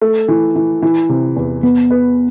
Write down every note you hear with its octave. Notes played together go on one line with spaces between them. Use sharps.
A3
E3
E3
E3
C3
E2
B3 B4
B4